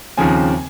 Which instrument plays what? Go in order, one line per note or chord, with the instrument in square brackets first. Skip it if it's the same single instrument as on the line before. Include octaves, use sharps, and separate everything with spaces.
[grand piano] D#2 C#3 F3 C4 G#5